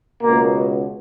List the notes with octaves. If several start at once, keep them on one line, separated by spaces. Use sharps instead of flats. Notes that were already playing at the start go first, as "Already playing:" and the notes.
C#2 B2 A#3